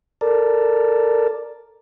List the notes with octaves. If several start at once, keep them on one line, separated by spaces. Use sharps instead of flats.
A4 A#4 D5